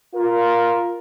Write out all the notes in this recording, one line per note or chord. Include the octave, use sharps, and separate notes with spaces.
F4 A#4